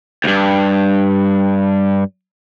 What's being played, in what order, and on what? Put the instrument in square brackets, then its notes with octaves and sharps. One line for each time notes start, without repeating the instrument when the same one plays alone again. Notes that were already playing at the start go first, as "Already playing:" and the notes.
[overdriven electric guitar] D2 G2